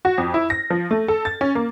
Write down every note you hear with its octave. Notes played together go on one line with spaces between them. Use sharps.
F#4
F2
E4
A#6
F3
A3
A4
A6
C#4
A#3